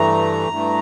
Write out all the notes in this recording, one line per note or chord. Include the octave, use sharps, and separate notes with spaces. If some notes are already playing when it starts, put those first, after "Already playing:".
Already playing: G2 E3 A3 A#5
G2 E3 A3